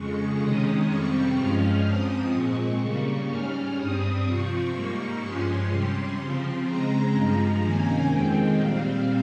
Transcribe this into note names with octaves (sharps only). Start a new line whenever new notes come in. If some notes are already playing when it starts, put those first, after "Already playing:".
Already playing: F2 C#3 G#3 C#6
C3 D#3 G#3 C#4 D#6
F2 C3 G3 C4 C#6
G2 F3 G#3 C#4 F6
G#2 F3 C4 D#6
A#2 G#3 C4 C#6
C#3 G3 A#3
G#2 G3 C#4 F6
G2 G3 C4 D#6
C3 F3 C4 C#6
G#2 G3 A#3
G2 F3 G#3 C#4 C6
C3 G3 C#4
C#3 F3 C4
C#3 G#3 C4 A#5
G2 F3 G#3
C3 D#3 A#3 C#4 G#5
F2 D#3 G#3 C4 G5
A#2 G3 C4 F5